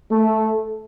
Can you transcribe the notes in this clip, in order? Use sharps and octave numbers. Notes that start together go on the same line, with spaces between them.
A3